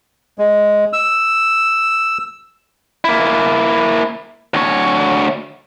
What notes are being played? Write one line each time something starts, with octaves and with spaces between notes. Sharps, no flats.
G#3
E6
A#3 E4
D2 C#5